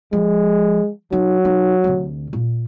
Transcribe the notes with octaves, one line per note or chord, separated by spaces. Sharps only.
F3 G#3
F#3 D#4
D#4
D2 C3
A#2